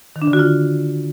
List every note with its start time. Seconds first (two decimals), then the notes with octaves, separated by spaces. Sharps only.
0.16 D#3
0.22 D4
0.27 D3
0.33 F#4
0.39 F4